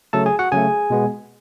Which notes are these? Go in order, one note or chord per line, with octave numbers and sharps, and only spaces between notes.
C#3 F#3 A3 A4 A5
G#4 G#5
F#4 F#5
C#3 F#3 A3 G#4 G#5
B2 G#3 B3